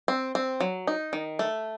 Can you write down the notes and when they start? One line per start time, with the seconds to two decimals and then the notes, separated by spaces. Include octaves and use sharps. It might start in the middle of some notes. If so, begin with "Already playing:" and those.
0.08 C4
0.35 C4
0.60 F#3
0.87 D#4
1.13 D#3
1.39 A3